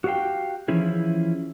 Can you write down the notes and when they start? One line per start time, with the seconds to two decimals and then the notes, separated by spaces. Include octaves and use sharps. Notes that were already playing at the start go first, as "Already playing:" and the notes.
0.04 F#4 G4 C#5 F5 G5
0.68 E3 F3 C#4 E4 G#4